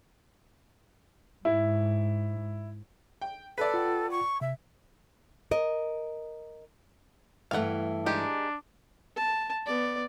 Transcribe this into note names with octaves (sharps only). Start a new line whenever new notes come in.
G#2 E4
G5
A4 B4 D5 B6
F4 F#5 G5
C#6
C3 E5
A#4 D#5
G2 E3 A3 F5 F#5
D#3 G#3 D4 G4
A5
B3 D5